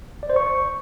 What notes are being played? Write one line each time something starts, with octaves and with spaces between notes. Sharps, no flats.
D5
C5
C#6